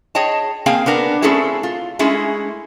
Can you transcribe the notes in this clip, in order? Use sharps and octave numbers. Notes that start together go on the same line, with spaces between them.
G#4 C#5 D#5 G5 A5
A#3 C4 G#4 F5 G5 G#5
B3 D4 A#4
A3 C4 C#4 E4 G#4 A4
F4
G#3 A3 C#4 E4 G#4